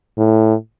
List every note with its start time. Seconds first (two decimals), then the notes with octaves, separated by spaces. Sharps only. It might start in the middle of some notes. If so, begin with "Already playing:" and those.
0.18 A2